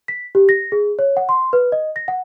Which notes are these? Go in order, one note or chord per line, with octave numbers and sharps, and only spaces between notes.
B6
G4
A#6
G#4
C#5
F#5
C6
B4
D#5
A#6
F#5